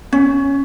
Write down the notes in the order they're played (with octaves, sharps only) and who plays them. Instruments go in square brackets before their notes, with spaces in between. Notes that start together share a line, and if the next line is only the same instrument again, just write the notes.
[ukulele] C#4